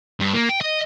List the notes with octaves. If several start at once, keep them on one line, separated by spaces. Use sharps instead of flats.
G2
A#3
G5
D#5